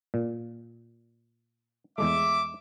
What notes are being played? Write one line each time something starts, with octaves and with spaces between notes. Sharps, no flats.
A#2
E2 G#3 A3 E5 D6